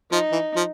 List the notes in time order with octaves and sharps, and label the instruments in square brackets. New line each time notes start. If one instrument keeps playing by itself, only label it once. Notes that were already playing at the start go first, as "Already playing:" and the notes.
[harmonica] F3 [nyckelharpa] D#4
[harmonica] E3
F3